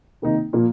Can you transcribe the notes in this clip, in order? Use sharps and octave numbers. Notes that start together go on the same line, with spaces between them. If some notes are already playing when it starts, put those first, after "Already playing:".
C3 D#3 A#3 D#4
A#2 F3 A#3